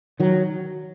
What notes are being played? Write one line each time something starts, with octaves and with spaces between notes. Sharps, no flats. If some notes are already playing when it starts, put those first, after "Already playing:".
D#3 F#3